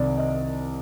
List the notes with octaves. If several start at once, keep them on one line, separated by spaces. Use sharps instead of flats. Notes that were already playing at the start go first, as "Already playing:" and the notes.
Already playing: C2 C3 D#3 D5
D#5